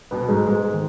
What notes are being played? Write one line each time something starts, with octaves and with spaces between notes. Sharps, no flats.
B2 B3
G#2 G#3
G#2 G#3
D#3